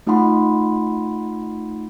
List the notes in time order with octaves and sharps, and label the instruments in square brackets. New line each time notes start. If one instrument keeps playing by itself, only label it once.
[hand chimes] A3 D#4 F4 F#5 B5 C6